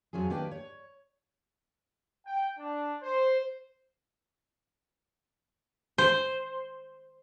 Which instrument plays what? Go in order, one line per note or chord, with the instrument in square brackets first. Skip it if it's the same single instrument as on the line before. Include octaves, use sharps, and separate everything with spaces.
[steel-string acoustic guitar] F2 D3 F#3 C#4 F4 G#4
D#3 A#3 D4 G4 B4 G5
C#5
[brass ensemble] G5
D4
C5
[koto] C5